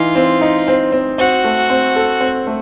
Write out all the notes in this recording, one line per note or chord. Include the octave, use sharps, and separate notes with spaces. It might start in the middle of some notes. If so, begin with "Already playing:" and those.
Already playing: E3 D#4 F4
C4
D#4
C4
C4
C4 F#4
A3
C4
A4
C4
A3